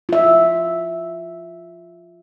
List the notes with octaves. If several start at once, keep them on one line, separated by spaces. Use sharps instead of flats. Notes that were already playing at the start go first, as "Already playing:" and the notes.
F4 E5